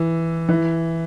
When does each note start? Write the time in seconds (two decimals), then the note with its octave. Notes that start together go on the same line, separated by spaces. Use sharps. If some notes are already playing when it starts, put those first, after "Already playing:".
Already playing: E3
0.49 E3